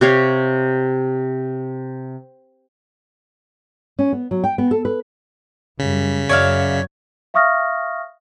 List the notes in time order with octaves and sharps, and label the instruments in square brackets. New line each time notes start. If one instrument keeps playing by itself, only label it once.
[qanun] C3 G4 C#5 F5
[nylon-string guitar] C#4
B3
F#3
G5
B3
A4
B4
[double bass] F#2 G3 [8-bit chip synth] C#3 B6
[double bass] F#2 F#3 [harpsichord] C#5 [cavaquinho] D5 E5 F5
[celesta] E5 F5 C#6 D#6 F6 A#6